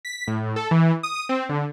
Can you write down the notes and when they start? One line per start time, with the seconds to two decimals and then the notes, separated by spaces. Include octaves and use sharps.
0.05 B6
0.27 A2
0.56 A4
0.71 E3
1.03 D#6
1.16 D#6
1.29 C4
1.49 D3